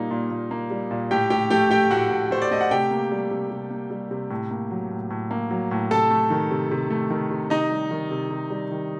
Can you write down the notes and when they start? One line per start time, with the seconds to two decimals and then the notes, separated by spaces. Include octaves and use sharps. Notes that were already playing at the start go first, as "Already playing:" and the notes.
Already playing: A#2 G3 A#3 D#4
0.11 A#2
0.31 A#2
0.51 A#3
0.70 G3
0.91 A#2
1.11 A2 G4 G5
1.30 A2 G4 G5
1.50 A3 G4 G5
1.71 A3 G4 G5
1.90 A2 F#4 F#5
2.11 A2
2.31 A3 C5
2.42 D5
2.51 A3 D#5
2.61 F#5
2.71 C3 G4 G5
2.91 A#3
3.11 G3
3.31 C3
3.51 C3
3.70 A#3
3.91 G3
4.11 C3
4.30 A2
4.51 A#3
4.71 F#3
4.91 A2
5.10 A2
5.31 A#3
5.51 F#3
5.71 A2
5.91 C3 A4 A5
6.10 A3
6.30 D#3
6.51 C3
6.71 C3
6.90 A3
7.10 D#3
7.31 C3
7.50 C3 D#4 D#5
7.71 G3
7.91 D#3
8.11 C3
8.30 C3
8.51 G3
8.71 D#3